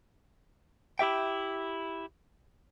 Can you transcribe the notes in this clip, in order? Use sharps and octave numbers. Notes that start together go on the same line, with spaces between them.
E4 G4 E5 G5